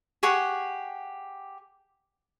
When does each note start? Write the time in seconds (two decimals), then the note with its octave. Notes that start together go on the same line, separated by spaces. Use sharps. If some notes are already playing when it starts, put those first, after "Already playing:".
0.23 G4 G#4 F#5 C#6